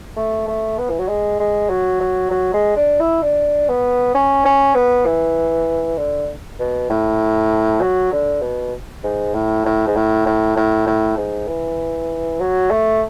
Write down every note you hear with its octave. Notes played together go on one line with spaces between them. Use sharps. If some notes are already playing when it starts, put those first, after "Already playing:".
A3
A3
B3
E3
F#3
G#3
G#3
F#3
F#3
F#3
G#3
D4
E4
D4
B3
C#4
C#4
B3
E3
D3
B2
A2
F#3
D3
B2
G#2
A2
A2
G#2
A2
A2
A2
A2
G#2
E3
F#3
A3